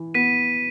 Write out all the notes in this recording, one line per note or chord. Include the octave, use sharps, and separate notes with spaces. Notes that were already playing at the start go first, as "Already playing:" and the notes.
Already playing: E3
B3 B6 D#7